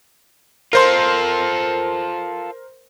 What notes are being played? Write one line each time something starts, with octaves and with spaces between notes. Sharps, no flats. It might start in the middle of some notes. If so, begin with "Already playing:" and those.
F4 A4 A#4 C5 C6